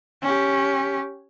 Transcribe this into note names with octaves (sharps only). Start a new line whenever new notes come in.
C#4 G4